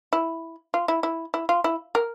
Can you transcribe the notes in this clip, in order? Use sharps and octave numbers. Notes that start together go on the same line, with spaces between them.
E4
F4
E4
E4
E4
F4
E4
A#4